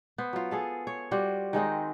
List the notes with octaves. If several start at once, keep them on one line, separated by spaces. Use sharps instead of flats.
B3 C5
F#3 F4
G#4 A4 F5
C#5
G3 F4 F#4 C5
D#3 G#3 C4 D#4